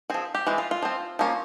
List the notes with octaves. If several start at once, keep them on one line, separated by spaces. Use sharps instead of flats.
F3 C4 G#4
G4
E3 G#3 C4
F4
F4
F3 C4
F3 A#3 C#4